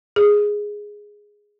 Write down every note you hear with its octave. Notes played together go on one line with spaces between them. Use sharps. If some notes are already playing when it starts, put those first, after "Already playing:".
G#4